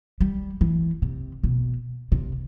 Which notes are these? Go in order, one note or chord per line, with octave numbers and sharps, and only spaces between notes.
G3
E3
C3
B2
C3